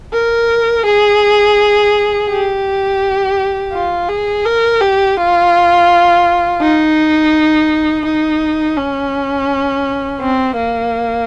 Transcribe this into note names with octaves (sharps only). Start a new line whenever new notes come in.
A#4
G#4
G4
F4
G#4
A#4
G4
F4
D#4
D#4
C#4
C4
A#3